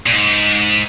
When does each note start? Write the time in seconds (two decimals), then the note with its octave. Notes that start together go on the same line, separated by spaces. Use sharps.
0.06 A#2
0.12 G#2